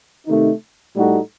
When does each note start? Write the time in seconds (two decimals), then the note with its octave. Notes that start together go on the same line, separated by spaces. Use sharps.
0.27 C3 D#3 A3 D#4
0.96 A2 G3 D#4 F#4 A4